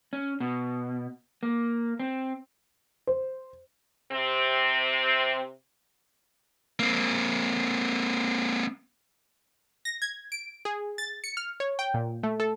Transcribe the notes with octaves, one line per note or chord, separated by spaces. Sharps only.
C#4
B2
A#3
C4
C5
C3 C4
A#3 C4
A#6
G#6
D7
G#4
A6
C#7
F6
C#5
G5
A#2
A3
A4